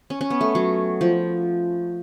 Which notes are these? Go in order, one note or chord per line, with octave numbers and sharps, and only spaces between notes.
C#4
C#4
B3
A3
F#3
F3